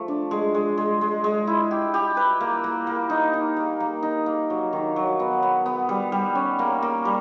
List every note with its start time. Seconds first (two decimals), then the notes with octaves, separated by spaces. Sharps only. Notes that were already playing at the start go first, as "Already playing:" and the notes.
Already playing: F3 A3
0.08 D4
0.31 G#3
0.54 G#3
0.78 G#3
1.01 G#3
1.24 G#3
1.47 E4
1.71 G4
1.94 G4
2.17 B4
2.40 A#3
2.64 A#3
2.87 A#3
3.10 D#4
3.33 D#4
3.57 A#3
3.80 A#3
4.03 D#4
4.26 A#3
4.50 F#3
4.73 D#3
4.96 F#3
5.20 B3
5.43 B3
5.66 B3
5.89 G3
6.12 G3
6.35 C#4
6.59 A#3
6.82 A#3
7.05 G3